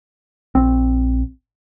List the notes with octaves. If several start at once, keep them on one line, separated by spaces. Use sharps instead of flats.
A#1 C4